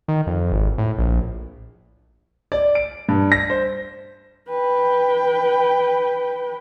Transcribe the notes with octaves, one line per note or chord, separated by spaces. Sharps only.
D#3
F2
G#1
A2
A#1
D5
D7
G2
A#6
C5
B4 G5